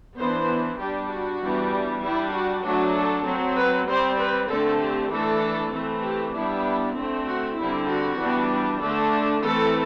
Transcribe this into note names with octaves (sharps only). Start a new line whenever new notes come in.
E3 B3 D4 C5
G3 D4 G4
F#4
E3 G3 B3 D4
G3 D4 E4
F#4
F#3 A3 D4 F#4
A4
F#3 C4
B4
G3 C4 C5
B4
D3 A3 C4 A4
G4
E3 A3 D4 A4
E3 A3 C4
G4
G3 B3 D4 E4
D3 A3 C4
F#4
D3 G3 C4 E4
F#4
E3 G3 B3 D4
D3 A3 D4 A4
E3 A3 C4 A4